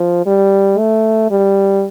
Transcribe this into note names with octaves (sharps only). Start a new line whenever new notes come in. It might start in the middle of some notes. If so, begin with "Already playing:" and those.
Already playing: F3
G3
A3
G3